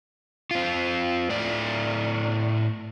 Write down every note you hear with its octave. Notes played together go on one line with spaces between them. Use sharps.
C4 F4
A2 A3 D5